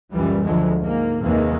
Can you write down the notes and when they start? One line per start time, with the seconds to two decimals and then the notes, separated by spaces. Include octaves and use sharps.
0.11 C#2 F#2 A#2 E3 G3
0.44 D2 D3 F3 F#3 G#3
0.79 G#2 A#3
1.22 D#2 C3 D#3 E3 G#3 A#3